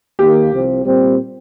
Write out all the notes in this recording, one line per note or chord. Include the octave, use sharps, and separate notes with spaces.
D#2 D#3 A#3 G4
C2 C3 F3 C4
A#2 G3 C4